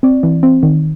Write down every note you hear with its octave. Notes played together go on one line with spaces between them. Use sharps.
C4 D5
E3
C4
D#3